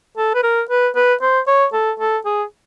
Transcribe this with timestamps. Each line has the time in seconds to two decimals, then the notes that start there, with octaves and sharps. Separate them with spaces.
0.17 A4
0.34 B4
0.43 A#4
0.70 B4
0.96 B4
1.22 C5
1.47 C#5
1.73 A4
1.99 A4
2.25 G#4